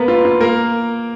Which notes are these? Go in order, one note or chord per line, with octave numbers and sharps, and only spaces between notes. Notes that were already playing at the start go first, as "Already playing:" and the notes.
Already playing: A#3 B3 A#4 B4
F4
F4
A#3 A#4